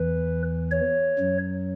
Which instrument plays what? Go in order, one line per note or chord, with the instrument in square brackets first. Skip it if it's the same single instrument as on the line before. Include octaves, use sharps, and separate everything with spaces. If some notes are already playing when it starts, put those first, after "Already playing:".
Already playing: [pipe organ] E2 E3 B4
C#5
F#2 F#3